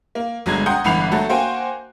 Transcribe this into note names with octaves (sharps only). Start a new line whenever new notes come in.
A#3
G1 F#3 G#3 G#6
F#5 G5 A#5 C6 D#6 G6
G1 E3 F#5 B5 C7 F7
F#3 A3 F#4 A4
A#3 F#4 C5 G5 G#5